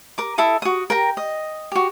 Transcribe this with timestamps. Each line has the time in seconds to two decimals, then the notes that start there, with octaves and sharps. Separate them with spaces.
0.18 A#4 D6
0.38 E4 A4 E5 D#6
0.62 F#4 D#6
0.90 A#4 G5 A#5
1.17 D#5
1.72 F#4 G4